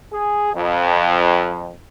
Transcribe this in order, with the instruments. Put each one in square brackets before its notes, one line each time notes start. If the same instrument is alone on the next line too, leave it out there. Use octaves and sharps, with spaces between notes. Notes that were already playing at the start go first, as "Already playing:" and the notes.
[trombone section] G#4
F2